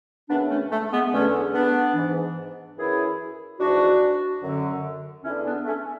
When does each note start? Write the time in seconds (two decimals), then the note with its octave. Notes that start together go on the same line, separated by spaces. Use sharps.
0.29 F#2 C#3 E3 B3 D4
0.50 A3 C#4
0.72 A3
0.91 G#3 B3
1.12 E2 D3 A3 C#4
1.53 B3 D4
1.94 G#2 E3
2.78 F#2 E3 E4 G#4
3.60 G#2 E3 D4 F#4
4.42 F#2 D3
5.24 E2 C#4 E4
5.29 D3
5.46 B3 D4
5.66 A3 C#4